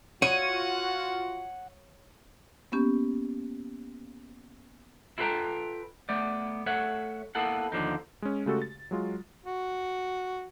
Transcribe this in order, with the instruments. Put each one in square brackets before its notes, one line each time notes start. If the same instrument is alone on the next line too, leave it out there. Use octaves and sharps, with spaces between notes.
[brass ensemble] F4 F#4 [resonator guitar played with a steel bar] C#5 [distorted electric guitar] F#5 [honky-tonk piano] D#7
[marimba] A#3 B3 C#4 G4
[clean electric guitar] E4 F4 A4 B4 G5 A#5
A3 B3 D5
A3 C#5 E5 F#5
A#3 B3 E4 A4 F#5
D#2 D3 F3 D#4
[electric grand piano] G#3 C#4
C#3 G#3 A3 F#4 G4 A4
A6
F#3 G#3 F4
[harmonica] F#4